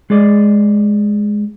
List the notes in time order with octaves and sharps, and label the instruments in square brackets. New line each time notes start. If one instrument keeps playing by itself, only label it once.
[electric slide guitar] G#3 G#4 D5 D#5